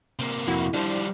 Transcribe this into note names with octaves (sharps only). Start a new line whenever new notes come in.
C3 A#3
F2 E4 F#4
F3 G3 D4 C5